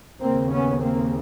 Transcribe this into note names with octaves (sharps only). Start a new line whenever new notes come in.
C#3 A#3 C4
D#2
B3 C#4
A#3 C4